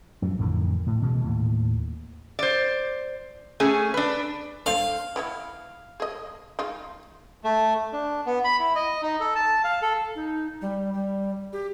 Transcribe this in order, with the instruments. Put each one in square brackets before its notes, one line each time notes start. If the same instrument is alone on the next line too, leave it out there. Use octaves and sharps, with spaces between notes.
[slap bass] F#2 F3
A1 F2 D3 D#3
A2
B2 E3 G3 G#3
D#2 A2
[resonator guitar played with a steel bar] C5 D5
A3 C#4 G#4
D4 B4
[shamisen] D4 A4 C5 [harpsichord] F5
[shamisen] E3 B3 E4
G#4 D#5
G#3 D#4 F4
[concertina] A3
D4
B3
B5
E4
D#5
D#4
A4
A5
F5
A4
[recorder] D#4
G3
G3
G4